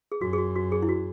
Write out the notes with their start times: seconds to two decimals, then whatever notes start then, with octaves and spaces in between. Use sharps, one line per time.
0.12 G#4
0.21 F#2 F#4
0.33 G#4
0.38 F#4
0.56 F#4
0.72 G#4
0.83 E4
0.89 F#4